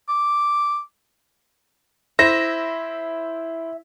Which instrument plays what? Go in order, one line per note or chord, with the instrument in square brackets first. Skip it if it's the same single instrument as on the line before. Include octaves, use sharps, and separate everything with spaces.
[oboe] D6
[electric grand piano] E4 C5 [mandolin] E5 [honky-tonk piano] A#6